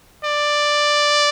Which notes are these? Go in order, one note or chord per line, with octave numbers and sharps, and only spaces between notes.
D5